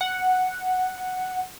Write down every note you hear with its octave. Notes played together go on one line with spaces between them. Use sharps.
F#5